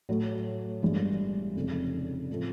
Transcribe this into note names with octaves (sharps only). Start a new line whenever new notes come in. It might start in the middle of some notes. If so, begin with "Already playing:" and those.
A2 F#3 A3
G1 G2 E3 G#3
F1 F2 C#3
A2 F3 A3 C4